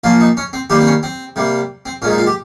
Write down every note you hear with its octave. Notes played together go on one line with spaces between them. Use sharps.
A#2 F3 A#3 F4
D#4
C#4
C4
D#3 G3 A#3 G4
C4
C#4
C4
C3 G3 A#3
C4
A#2 G#3 C#4 D#4
F4
G4